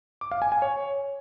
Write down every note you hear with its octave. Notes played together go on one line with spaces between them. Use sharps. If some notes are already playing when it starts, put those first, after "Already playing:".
D6
F5
G#5
G#5
C#5